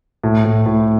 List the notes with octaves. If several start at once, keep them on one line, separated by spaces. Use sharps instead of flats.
A2
A2
A2